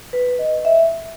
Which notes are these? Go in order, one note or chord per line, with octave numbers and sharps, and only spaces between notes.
B4
D#5
E5